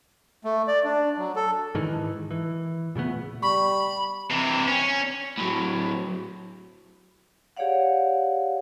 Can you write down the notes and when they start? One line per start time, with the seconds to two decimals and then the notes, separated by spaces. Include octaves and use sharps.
0.44 A3
0.68 D5
0.84 D4
1.18 F#3
1.36 A4
1.75 G#2 D#3 E3
2.31 E3
2.95 A#2 C#3 A3 B3
3.42 G3 B5 C#6
4.30 C3 E3
4.68 C#4
5.38 A2 F#3
7.57 G4 G#4 C#5 D5 F5 F#5